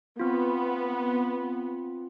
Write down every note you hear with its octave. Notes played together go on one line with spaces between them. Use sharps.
B3 C4 F4